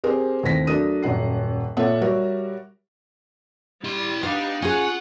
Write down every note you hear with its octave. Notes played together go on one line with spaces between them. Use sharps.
C4 G4 G#4 A#4 C5
D#2 A2 C4 A#6 B6
F#3 A3 D4 A#4 D#6 D#7
D#1 F#2 F#5 C7
A#2 A4 C#5 E5 F#5
G3 F#4 A#4 C#5 E5
G3 E4 C6
B3 D4 D#4 G4 F5
C#4 F4 G#4 F#5